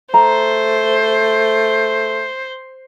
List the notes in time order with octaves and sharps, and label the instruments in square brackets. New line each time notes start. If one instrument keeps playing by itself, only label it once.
[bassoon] A3 [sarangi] C5 [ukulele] A#5